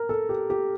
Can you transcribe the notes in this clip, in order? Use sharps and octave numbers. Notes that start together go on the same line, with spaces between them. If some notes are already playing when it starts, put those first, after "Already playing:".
Already playing: A#4
A4
G4
G4